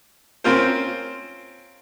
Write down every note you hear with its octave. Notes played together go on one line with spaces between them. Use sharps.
C4 C#4 F4 A#4 C5